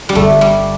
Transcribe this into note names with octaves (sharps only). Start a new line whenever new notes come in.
G3
G1 A3
G3